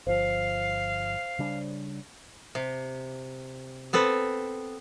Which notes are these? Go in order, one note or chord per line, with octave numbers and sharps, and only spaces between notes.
G1 F3 C5 F5
C#3 G3 D4
C3
B3 C4 A4 B4